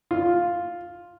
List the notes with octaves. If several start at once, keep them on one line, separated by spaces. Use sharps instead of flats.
F4